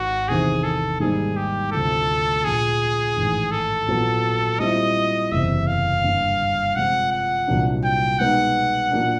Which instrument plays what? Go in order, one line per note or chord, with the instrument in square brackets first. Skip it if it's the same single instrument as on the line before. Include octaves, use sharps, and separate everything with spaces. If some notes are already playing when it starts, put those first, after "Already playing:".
Already playing: [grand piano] G#1 G#2 D#3 [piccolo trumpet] F#4
[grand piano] E2 C3 D#3 [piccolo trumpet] G#4
[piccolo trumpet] A4
[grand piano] G#2 D#3 G3 A#3 D#4 [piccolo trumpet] G#4
[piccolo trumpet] G4
[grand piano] D2 C3 F3 A3 [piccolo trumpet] A4
[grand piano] A#1 A#2 F3 [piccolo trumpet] G#4
[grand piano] A1 G#2 D#3
[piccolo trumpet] A4
[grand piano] A#1 A#2 F#3 B3
[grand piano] A#2 G3 C4 E4 [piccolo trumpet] D#5
[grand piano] F#1 E2 C3 [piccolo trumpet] E5
[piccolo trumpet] F5
[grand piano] G2 D3 G3 A#3
[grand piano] C3 F3 G#3 C4 F4 [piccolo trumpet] F#5
[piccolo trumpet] F#5
[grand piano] C2 A#2 F#3 A#3 D4
[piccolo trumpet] G5
[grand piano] B2 G#3 B3 D#4 [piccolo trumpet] F#5
[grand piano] A#2 F#3 A#3 D4